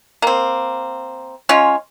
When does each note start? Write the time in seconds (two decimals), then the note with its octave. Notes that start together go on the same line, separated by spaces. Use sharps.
0.22 A#3 C4
1.49 G#3 C#4 F4 C#5